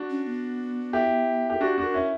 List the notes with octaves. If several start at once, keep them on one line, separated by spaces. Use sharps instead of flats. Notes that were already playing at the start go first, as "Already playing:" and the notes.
Already playing: D4 F#4
C#4
B3
E4 G4
G4 A#4
D4 F#4 G4
D4 F#4
A#4
C#4 E4